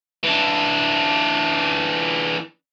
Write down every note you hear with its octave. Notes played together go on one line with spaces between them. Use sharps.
E3 D4